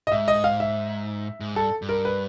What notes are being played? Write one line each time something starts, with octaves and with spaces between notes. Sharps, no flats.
D#5
G#2 E5
D#5
F5
E5
G#2
G2 A4
G2
A#4
B4